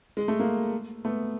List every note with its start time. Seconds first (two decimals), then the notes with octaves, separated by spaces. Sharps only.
0.17 G#3
0.28 A3
0.39 G#3 A#3
1.05 A3 B3